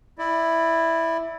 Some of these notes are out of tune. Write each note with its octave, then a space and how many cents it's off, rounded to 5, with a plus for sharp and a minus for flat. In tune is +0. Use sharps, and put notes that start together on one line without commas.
E4 +0 D5 +25